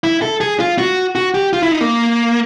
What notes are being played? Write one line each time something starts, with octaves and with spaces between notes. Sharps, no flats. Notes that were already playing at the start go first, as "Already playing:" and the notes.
E4
A4
G#4
F4
F#4
F#4
G4
F4
E4
D#4
A#3